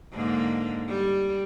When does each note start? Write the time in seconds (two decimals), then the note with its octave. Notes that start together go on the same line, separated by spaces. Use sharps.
0.13 G#2 D3 A#3
0.88 G3